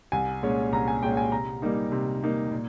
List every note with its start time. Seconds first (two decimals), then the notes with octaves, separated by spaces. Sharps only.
0.12 C2 G#5
0.43 A#2 G#3 C#4
0.72 C2 A#5
0.88 G#5
1.03 A#2 G#3 C#4 G5
1.17 G#5
1.32 C3 A#5
1.62 G3 A#3 D#4
1.92 C3
2.23 G3 A#3 D#4
2.52 A#2